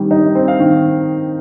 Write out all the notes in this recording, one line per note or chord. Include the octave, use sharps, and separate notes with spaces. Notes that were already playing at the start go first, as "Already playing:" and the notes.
Already playing: D#3 G3 C4
D#4
C4
F5
D#3